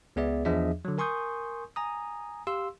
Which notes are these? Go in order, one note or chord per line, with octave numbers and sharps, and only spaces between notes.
C#2 B3 G#4 D5 E5
E2 F3 D4 G#4 D#5 E5
D3 F#3
A#4 G#5 C6 C#6 D#6 G6
G#5 A#5 D#6
G4 F5 C6 E6